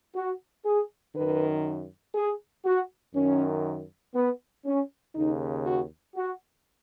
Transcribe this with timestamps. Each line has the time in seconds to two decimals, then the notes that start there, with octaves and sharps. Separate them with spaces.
0.15 F#4
0.65 G#4
1.15 F#2 D#3 B4
2.15 G#4
2.65 F#4
3.15 F#2 D#3 C#4
4.14 B3
4.65 C#4
5.15 D#2 C#3 D#4
5.65 F#4
6.15 F#4